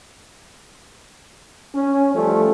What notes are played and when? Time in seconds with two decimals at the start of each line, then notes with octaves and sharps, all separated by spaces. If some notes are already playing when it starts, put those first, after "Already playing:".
1.74 C#4
2.14 F3 G3 A3